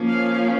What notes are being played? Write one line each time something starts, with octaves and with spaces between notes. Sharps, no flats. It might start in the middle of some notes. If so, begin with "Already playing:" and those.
Already playing: F3 A#3 C#4
F5